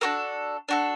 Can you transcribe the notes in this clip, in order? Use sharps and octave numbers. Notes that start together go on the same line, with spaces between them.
D4 F#4 A4 A#4
D4 F#4 A4